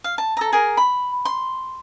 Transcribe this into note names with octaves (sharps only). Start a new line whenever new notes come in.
F5
A5
A4 A#5
G#4 A#4
B5
C6